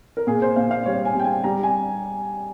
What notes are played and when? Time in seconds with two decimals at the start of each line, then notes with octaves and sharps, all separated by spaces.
0.17 A#4
0.27 A#2 G#4
0.42 C5
0.56 A#2 F5
0.71 F5
0.86 G3 C#5
1.05 G#5
1.15 G3
1.20 G5
1.24 G#5
1.44 G3 A#5
1.63 G#5